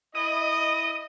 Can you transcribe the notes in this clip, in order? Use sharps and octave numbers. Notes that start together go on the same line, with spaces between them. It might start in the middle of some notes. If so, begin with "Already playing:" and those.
E4 D#5 D#6